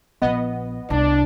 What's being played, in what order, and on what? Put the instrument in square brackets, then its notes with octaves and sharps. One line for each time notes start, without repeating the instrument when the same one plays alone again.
[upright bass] A#1 [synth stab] B3 D#5
[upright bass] C2 [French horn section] D4